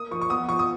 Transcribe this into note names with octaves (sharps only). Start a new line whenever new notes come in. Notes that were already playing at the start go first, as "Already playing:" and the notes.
Already playing: A#3 D#6
F3 C#6
C#6
B3 D#6
F3 C#6
D#6